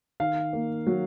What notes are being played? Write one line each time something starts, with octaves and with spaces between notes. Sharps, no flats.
D#3 F5
A#3
F#3